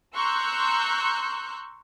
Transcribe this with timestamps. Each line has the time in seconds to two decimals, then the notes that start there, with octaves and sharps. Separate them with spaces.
0.15 A#5 C6 C#6 E6 F#6 G6